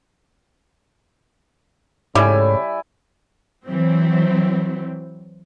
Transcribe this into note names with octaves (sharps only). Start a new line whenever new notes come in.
G#2 C#3 G3 A3 E4 C#5 D5 G#5
E3 F#3 C4